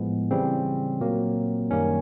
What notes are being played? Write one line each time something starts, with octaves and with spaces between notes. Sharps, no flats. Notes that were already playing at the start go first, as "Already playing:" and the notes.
Already playing: A2 F3 G#3 B3
C#3 E3 G3 C4
A#2 F#3 A#3
F#2 D#3 G3 A#3 C#4